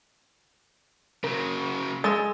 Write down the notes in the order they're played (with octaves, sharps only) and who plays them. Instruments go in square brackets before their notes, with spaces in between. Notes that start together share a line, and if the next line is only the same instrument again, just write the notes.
[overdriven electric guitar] C#3 F#3 [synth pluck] A#4
[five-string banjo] G#3 [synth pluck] E6 A6